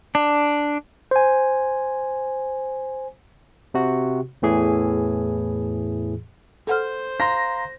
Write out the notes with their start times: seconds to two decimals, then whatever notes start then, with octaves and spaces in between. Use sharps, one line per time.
0.15 D4
1.11 C5 G#5
3.74 C3 F#4
4.42 E2 A2 E3 G#4
6.67 A4 C5 F#5 F6
7.20 F5 A#5 C6 A#6